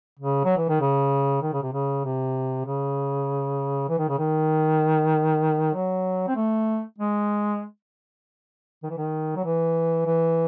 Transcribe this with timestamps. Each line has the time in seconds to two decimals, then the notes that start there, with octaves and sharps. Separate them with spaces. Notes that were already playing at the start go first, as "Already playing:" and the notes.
0.19 C#3
0.45 F#3
0.57 E3
0.68 D#3
0.81 C#3
1.42 D#3
1.53 C#3
1.62 C3
1.73 C#3
2.04 C3
2.66 C#3
3.89 E3
3.99 D#3
4.09 C#3
4.19 D#3
5.74 F#3
6.28 C4
6.36 A3
6.98 G#3
8.83 D#3
8.90 E3
8.97 D#3
9.36 F#3
9.45 E3
10.06 E3